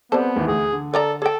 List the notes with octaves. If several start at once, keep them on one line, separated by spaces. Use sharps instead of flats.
G3 B3 C4 A4 B4 C5
D#2 E3
D2 G#4
D3
A4 A#4 D5 A#5
G#4 A4 G5